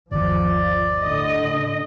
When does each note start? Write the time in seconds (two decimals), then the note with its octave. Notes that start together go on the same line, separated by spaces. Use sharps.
0.11 G1 D#2 F3 D5
1.01 A2 D3 D#5